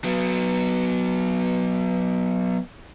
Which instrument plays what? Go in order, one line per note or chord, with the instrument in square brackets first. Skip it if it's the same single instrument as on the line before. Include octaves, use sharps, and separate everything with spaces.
[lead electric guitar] F#3 B3